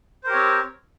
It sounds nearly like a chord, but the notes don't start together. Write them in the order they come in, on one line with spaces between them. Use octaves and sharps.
C5 A#4 G4 C#5 C4